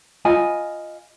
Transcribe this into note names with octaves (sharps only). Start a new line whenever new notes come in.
F4 D#5 G#5 B5